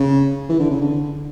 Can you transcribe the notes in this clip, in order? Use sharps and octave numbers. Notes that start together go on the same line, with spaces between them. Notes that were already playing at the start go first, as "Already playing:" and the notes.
Already playing: C#3
E3
D3
C#3
D3